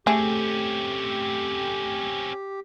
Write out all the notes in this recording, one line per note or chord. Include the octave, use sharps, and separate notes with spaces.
A3 C4 C#4 G4 G#4